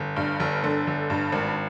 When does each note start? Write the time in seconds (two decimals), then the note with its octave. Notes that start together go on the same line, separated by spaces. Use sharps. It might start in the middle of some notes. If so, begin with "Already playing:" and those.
Already playing: G1
0.16 G2
0.40 G1
0.64 D3
0.87 G1
1.10 G2
1.32 G#1